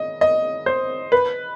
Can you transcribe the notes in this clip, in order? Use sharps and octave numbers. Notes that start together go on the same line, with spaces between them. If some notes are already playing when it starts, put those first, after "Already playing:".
Already playing: D#5
D#5
C5
B4